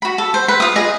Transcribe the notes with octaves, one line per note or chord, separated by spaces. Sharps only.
F#4 B5
A4
C5
B4
F4 D#6
G#4 D#5